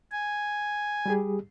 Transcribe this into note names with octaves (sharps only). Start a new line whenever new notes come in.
G#5
G3 G4 G#4